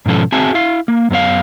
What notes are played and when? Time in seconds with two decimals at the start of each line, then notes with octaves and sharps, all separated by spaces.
0.06 G#2 B2 F3 C#4 A4
0.32 C4 F#4 G#4 E5 G#5 A5
0.54 E4 F5
0.88 A#3
1.10 F#2 B3 C#5 F5